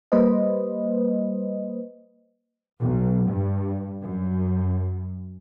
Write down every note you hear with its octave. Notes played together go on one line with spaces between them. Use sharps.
G3 A#3 B4 C5 D#5
B1
G2
F#2